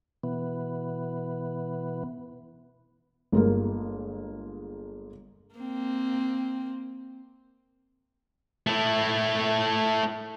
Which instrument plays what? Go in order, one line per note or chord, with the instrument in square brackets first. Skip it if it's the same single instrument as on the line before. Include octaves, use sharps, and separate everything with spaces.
[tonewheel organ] B2 E3 B3
[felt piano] G1 G#3 A#3
[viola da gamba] A#3 C4
[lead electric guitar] A3 E4